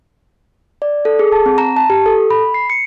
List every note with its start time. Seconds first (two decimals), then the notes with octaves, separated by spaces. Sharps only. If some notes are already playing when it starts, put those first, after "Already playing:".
0.82 D5
1.05 A4
1.19 G#4
1.32 A5
1.46 C4
1.58 A#5
1.77 A5
1.90 G4
2.06 A4
2.30 B5
2.54 C7
2.70 C#7